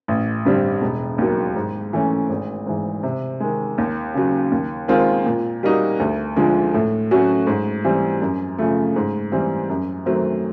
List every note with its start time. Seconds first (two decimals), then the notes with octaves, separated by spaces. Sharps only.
0.08 A1
0.45 G2 D3 G3 C4
0.82 E1
1.18 D#2 D#3 F#3
1.56 G#2
1.93 E3 A3 C#4
2.29 G#1
2.66 G#2 E3
3.03 C3
3.40 D#3 G#3
3.78 D#2
4.14 C#3 F#3
4.52 D#2
4.88 D#3 G#3 C4 F4
5.26 A#2
5.63 G3 A#3 D#4 F#4
6.00 D2
6.36 D3 F3 G#3
6.74 A2
7.11 F#3 A3 C#4 F#4
7.47 G#2
7.84 E3 G3 C4
8.22 F#2
8.58 C#3 F3 A3
8.96 G#2
9.32 E3 G3 C4
9.69 F#2
10.06 D#3 F#3 A3 C4